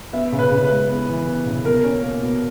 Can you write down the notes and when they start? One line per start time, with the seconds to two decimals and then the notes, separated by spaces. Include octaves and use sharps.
0.13 B3 E5
0.32 C#3
0.39 B4
0.51 C#3
0.64 B4
0.71 G#3
0.89 B3
1.08 E3
1.27 B3
1.46 C#3
1.65 B2 A#4
1.84 C#4
2.03 A#3
2.22 B2